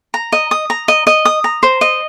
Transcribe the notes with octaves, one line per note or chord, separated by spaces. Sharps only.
A#5
D#5
D#6
A#5
D#5
D#5
D#6
A#5
C5
D#5